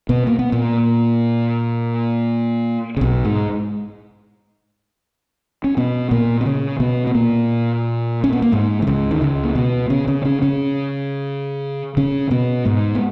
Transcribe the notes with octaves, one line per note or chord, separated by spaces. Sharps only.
B2 B3
A#3
B3
A#2 A#3
C#3
B1 B2
G#2 G#3
C#4
B2 B3
A#2 A#3
B3
C#3 C#4
B2 B3
B3
A#2 A#3
C#4
B3
A#3
G#2 G#3
D#3
C#2 C#3
D#3
C#2 C#3
A#3
B2 B3
C#3 C#4
C#3 C#4
C#3 C#4
C#3 C#4
C#3 C#4
B2 B3
G#2 G#3
B3